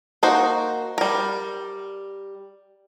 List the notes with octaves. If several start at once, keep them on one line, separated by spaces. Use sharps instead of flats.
A#3 D#4 F#4 C5
G3 A#4